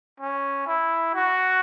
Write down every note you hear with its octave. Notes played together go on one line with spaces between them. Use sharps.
C#4
E4
F#4